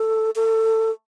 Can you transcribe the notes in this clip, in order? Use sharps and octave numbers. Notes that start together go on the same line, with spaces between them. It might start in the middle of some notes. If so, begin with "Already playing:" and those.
Already playing: A4
A4